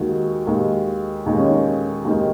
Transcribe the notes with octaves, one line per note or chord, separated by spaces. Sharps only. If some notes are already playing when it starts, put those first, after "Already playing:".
Already playing: D#2 D#3 G#3 F#4
D#2 D#3 G#3
D#2 D#3 G#3 D#4
C#4
D#4
D#2 D#3 G#3